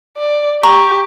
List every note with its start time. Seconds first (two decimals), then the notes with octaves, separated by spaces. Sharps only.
0.17 D5
0.63 G4 A#5 C#6